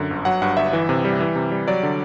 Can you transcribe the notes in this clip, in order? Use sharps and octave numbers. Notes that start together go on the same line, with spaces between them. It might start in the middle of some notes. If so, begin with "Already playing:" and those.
Already playing: F#2 D3
G1
F#3 F#5
G2 F#5
G1 E5
E3
C3
G3
E3
C3
G3
F#3 D5
D3